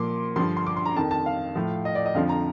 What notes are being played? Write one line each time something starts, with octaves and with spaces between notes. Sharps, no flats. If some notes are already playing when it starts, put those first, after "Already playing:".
Already playing: A#2 F3 C6 D6
G2 D3 F3 C6
C6
D6
C6
A#5
F2 D#3 A5
A5
F5
A2 F3
D#5
D5
D#5
F2 D3 F3 F5
A#5